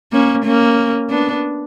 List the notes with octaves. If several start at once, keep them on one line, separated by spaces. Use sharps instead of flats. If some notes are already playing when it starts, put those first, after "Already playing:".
A#3 C#4
A#3 C#4
B3 D4